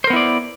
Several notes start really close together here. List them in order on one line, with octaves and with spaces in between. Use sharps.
C5 A#4 B3 E4 D5